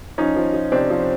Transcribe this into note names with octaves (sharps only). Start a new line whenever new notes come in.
F3 C#4 D#4
F3
F3
C3 C4 D4
F3